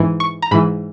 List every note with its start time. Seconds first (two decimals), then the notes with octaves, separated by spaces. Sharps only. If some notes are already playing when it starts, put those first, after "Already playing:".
Already playing: G#2 E3
0.20 C#6
0.42 A#5
0.51 G#2 E3 B5